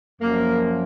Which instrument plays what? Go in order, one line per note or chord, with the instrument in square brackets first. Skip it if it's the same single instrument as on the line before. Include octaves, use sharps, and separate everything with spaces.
[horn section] F#2 F3 A#3